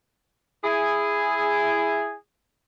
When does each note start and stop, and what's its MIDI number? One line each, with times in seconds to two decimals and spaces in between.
0.64 2.14 64
0.64 2.14 68